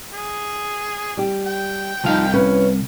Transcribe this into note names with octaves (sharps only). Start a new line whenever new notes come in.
G#4
G3 G4
G5
C2 F3 D#4 F5
C#4 E4 B4